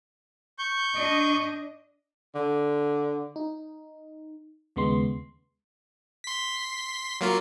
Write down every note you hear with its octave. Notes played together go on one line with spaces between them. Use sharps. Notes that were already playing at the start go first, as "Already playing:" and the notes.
C#6 G6
D4 D#5
D3
D#4
D#2 C#3 G#3 B3 C6
C6 B6
F#3 A#3 F4